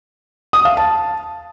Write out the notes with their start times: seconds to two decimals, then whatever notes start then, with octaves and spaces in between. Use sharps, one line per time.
0.53 D#6
0.65 F5
0.77 A5